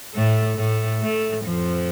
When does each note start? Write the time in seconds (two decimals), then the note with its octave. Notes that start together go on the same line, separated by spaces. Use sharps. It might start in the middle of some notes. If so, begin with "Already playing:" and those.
0.15 A2 A3
0.58 A2 A3
1.02 A2 A3
1.45 F2 F3